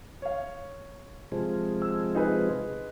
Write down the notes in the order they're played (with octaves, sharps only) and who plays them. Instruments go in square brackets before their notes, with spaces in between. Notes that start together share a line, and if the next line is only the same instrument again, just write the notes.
[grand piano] C#5 F5
[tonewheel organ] C3 F3 G#3
[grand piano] E6
D#4 G#4 B4